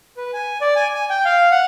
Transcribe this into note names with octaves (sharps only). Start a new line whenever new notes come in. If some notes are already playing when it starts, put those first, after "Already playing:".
B4
G#5
D5
G#5
G#5
G5
F5
F#5